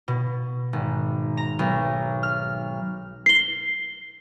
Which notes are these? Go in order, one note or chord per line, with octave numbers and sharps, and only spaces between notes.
B2
G#1
A#5
B1
F6
C7 G7